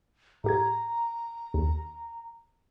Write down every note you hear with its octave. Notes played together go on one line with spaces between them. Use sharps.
A2 G4 A#5 G#6
D#2